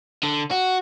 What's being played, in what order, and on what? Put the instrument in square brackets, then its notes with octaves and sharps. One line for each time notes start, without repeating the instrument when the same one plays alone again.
[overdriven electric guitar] D3
F#4